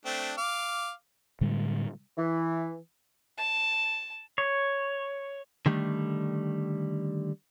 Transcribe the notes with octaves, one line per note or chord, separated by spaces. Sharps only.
A3 C4 D4
F5 D6
A2 D3 G3 G#3
E3
A5
C#5
D3 D#3 G3 A3